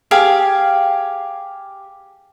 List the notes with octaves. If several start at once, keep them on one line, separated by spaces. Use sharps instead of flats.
G4 G#4 F5